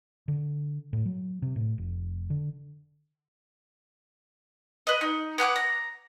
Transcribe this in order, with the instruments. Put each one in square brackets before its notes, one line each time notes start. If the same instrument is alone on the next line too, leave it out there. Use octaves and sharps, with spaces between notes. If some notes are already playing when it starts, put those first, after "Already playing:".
[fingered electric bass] D3
A2
F#3
C3
A2
F1
D3
[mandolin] B4 D#5
D#4
B3 F#5 G#5 D6
A#5